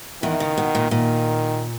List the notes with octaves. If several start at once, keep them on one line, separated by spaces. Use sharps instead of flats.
E2 D#3 E3
C#3
B2
A#2
A#2 D#3